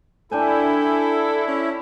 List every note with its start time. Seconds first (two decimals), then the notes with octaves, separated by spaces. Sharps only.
0.31 D4 E4 A4 G5 G#5
1.48 C#4